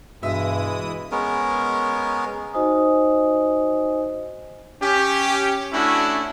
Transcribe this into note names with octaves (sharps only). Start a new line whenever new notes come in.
G2 B2 E3 G#3 E4 E5 D#6
G#3 B3 C#4 A#4
D#4 F#4 C5 D#5 G#5 D#6
C#4 G4
A3 C#4 D4 E4 F#4